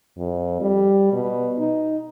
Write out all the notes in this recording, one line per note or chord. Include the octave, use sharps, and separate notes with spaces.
F2
G3
B2
D#4